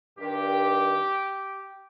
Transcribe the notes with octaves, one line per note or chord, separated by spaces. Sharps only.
G2 D#3 G4